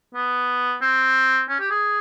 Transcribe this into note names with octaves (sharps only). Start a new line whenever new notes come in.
B3
C4
C#4
G4
G#4